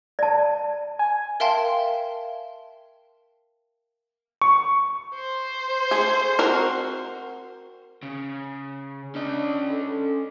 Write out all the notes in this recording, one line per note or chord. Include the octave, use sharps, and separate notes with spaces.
D5 A5
G#5
A#4 E5 F5 G5 A5 C6
C#6
C5
A3 G#4
C4 F#4 A#4
C#3
C#4 D4 D#5
A4